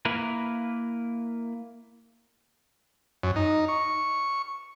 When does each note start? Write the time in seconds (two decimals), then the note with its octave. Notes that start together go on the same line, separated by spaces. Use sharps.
0.05 A#3 E4 A#4 B4
3.23 F#2
3.36 D#4
3.68 C#6